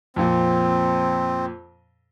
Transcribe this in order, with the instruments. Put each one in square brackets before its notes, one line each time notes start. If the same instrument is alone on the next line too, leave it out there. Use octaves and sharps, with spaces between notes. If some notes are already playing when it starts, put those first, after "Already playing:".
[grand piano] F2 A#2 [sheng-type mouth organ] C4